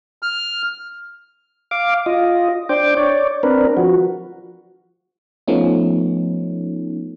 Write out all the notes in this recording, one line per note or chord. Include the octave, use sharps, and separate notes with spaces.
F6
F5 D6
F4 D#5
D4 C5 G5 D6
C#5 D5
C4 D4 A#4 B4
F3 F#4
F3 A3 B3 C#4 D#4